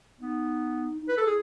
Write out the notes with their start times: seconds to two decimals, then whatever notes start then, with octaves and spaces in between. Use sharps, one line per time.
0.20 B3 D#4
1.02 D#4
1.09 E4 B4
1.18 A4
1.26 G#4